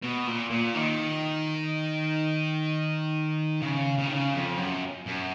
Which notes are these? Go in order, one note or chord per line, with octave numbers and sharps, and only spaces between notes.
B2
A#2
A#2
D#3
C#3
C#3
D#3
C#3
F2
F#2
F#2